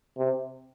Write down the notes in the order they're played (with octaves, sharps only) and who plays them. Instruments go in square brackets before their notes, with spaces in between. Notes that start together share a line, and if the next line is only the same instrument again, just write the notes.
[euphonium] C3